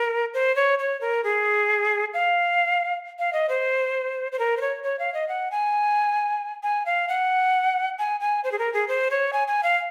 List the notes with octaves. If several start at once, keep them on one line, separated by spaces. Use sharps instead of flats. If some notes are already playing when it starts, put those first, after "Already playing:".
Already playing: A#4
C5
C#5
C#5
A#4
G#4
F5
F5
D#5
C5
C5
A#4
C5
C#5
C#5
F5
D#5
F#5
G#5
G#5
F5
F#5
G#5
G#5
C5
G#4
A#4
G#4
C5
C#5
G#5
G#5
F5